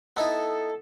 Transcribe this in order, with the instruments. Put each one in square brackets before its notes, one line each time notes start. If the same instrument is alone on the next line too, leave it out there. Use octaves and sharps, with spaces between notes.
[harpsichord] B3 D#4 E4 [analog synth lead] A4